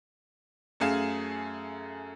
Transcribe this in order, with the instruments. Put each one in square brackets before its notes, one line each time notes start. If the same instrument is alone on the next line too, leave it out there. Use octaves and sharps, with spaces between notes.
[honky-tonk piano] F#2 A3 G#4 F5 E7